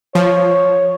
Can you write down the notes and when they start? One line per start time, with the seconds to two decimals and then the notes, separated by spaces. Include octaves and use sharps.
0.15 F3 C#5